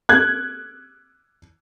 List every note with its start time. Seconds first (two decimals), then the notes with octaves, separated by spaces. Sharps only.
0.09 F#6 G#6